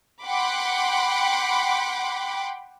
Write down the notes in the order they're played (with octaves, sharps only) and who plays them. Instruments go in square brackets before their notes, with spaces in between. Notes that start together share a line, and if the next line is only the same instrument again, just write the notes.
[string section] F#5 G5 B5 C6 D6